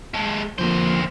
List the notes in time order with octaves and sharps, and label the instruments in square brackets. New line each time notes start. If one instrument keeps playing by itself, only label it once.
[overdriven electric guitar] G#3 A4
[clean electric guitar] F2 F3 A#3 [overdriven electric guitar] D3 C5